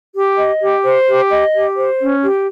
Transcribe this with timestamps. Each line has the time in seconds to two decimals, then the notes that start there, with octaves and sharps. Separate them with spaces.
0.15 G4
0.38 D#5
0.62 G4
0.84 C5
1.07 G4
1.30 D#5
1.54 G4
1.77 C5
2.00 C#4
2.23 G4